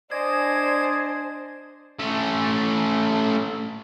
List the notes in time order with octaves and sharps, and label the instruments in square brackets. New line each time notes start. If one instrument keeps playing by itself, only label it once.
[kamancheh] D4 C5 [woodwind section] D5 D#5 G#5 [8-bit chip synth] G#6
[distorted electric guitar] A3 C#4